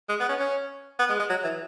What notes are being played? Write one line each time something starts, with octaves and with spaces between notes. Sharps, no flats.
G#3
B3
C#4
C#4
B3
G#3
G#3
F#3
E3